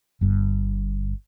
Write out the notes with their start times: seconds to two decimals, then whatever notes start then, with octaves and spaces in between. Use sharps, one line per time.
0.21 G1 G2